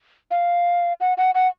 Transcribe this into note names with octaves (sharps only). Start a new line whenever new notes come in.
F5
F#5
F#5
F#5